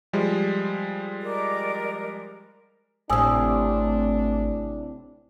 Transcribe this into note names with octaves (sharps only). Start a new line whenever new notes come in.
F3 G3 G#3
A#4 D5 D#5
G#1 A2 C3 D4 G#5 D#6 E6